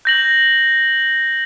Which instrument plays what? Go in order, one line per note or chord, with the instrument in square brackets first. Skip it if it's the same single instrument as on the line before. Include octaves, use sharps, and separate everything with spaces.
[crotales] G6 A#6 F#7